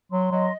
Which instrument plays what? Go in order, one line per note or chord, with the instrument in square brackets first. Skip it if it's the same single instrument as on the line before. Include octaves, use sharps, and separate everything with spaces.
[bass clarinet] F#3 [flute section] C6
[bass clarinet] F#3 [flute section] D#5